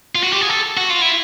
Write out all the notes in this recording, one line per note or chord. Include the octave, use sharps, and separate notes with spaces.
F4
F#4
G4
G#4
A4
F#4
F4
E4